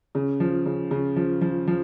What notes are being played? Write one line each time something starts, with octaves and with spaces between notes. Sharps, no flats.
C#3
F3
C#3
C#3
F3
F3
F3